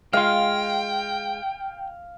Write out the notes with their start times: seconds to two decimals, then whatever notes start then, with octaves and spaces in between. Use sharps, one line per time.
0.13 G#3 F4 F5 G5